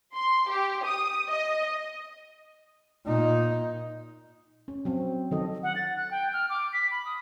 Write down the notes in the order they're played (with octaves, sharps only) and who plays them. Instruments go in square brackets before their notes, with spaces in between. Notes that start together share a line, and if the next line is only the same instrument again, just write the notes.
[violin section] C6
G4
D#6
D#5
[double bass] A#2 D#4
[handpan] C#4
F#3 C4
D#3 F#3 A4 D#5
[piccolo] F#5
A6
F#6
G5
F6
D6
B6
B5
D#6